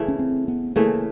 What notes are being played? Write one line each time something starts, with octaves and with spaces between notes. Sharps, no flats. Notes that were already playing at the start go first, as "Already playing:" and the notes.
Already playing: C#3 E3 A3
C#4
C4
B3
C#3 E3 A3 A#3